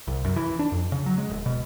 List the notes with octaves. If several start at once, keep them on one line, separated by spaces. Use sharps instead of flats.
C2
F#2
E3
D4
F2
C#3
F#3
G#3
D1
B2